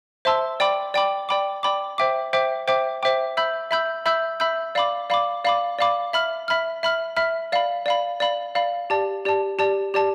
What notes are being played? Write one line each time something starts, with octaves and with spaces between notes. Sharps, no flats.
C5 E5 A5 C6 E6
D5 G5 B5 D6
D5 G5 B5 D6
D5 G5 B5 D6
D5 G5 B5 D6
C5 E5 G5 D6
C5 E5 G5 D6
C5 E5 G5 D6
C5 E5 G5 D6
E5 B5 E6 G6
E5 B5 E6 G6
E5 B5 E6 G6
E5 B5 E6 G6
D5 F5 B5 D6
D5 F5 B5 D6
D5 F5 B5 D6
D5 F5 B5 D6
E5 B5 F6
E5 B5 F6
E5 B5 F6
E5 B5 F6
D5 F5 B5
D5 F5 B5
D5 F5 B5
D5 F5 B5
G4 D5 A5
G4 D5 A5
G4 D5 A5
G4 D5 A5